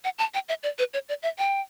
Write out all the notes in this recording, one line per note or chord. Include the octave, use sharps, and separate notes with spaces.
F#5
A5
G5
E5
D5
B4
C#5
D5
E5
G5